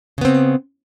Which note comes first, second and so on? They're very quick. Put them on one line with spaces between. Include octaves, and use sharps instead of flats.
C#3 B3 C4